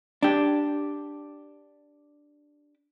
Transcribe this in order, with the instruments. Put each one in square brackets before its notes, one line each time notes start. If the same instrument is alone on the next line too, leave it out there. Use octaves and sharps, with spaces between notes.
[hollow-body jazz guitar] D4 G4